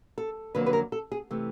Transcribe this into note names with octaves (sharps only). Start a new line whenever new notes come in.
A4
F2 D3 F#3 A#3 B4
B4
A#4
A4
G#4
C3 E3 A3